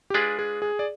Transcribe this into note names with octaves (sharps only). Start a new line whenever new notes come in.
G4
G#3 D4 F4 G#4 B4 D5
G#4
G#4
D5